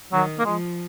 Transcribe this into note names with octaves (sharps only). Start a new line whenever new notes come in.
D#3 F#3
A#3
F3 G#3